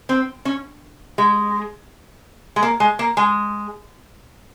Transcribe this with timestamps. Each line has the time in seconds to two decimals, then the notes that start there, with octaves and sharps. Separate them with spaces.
0.09 C4
0.45 C#4
1.18 G#3
2.56 G#3
2.63 A#3
2.80 G#3
2.99 A#3
3.17 G#3